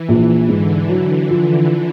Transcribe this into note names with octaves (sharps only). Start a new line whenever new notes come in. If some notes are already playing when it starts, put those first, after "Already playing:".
Already playing: E3
A#1
G#2 D3
F#3
F3